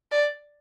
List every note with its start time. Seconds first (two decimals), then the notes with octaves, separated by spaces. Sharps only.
0.11 D5